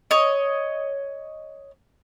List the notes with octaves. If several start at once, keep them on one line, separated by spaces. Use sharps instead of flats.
C#5 D#5